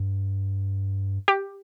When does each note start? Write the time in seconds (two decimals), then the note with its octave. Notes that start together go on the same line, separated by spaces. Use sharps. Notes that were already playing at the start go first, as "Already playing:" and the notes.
Already playing: G2
1.28 G4